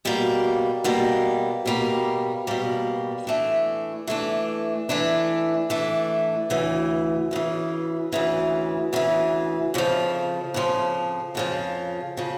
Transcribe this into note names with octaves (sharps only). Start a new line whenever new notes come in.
B2 G3 A#3
B2 G3 A#3
B2 G3 A#3
B2 G3 A#3
E3 A3 D4
E3 A3 D4
E3 A3 D4
E3 A3 D4
D2 C#3 E3
D2 C#3 E3
D2 C#3 E3
D2 C#3 E3
F2 C#3 F3
F2 C#3 F3
F2 C#3 F3
C#3 F3